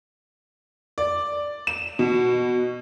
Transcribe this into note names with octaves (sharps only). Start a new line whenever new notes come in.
D5
E7
B2